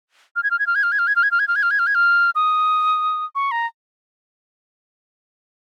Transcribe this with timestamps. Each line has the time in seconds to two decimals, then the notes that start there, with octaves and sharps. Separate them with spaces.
0.36 F6
0.43 G#6
0.51 F6
0.59 G#6
0.67 F6
0.75 G#6
0.83 F6
0.92 G#6
0.99 F6
1.07 G#6
1.16 F6
1.23 G#6
1.31 F6
1.39 G#6
1.48 F6
1.56 G#6
1.63 F6
1.71 G#6
1.79 F6
1.87 G#6
1.95 F6
2.35 D#6
3.35 C#6
3.51 A#5